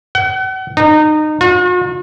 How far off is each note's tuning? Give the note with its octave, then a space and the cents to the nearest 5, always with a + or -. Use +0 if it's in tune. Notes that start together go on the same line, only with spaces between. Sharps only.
F#5 +40
D#4 -25
F#4 -45